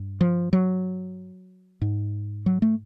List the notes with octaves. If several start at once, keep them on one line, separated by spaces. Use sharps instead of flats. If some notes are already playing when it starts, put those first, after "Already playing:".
Already playing: G2
F3
F#3
G#2
F#3
A3